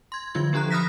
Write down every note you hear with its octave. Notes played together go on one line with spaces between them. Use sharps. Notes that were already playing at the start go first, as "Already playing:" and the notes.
C6 G#6
D3 F3 F#3 F4 G#6
F3 D4 G4 A4 A#5 F#6
B5 D#6 F6 F#6 A#6 B6